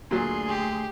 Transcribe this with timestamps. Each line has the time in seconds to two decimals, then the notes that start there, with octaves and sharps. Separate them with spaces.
0.11 D2 A#2 F#3 A3 G#4 C6
0.48 G4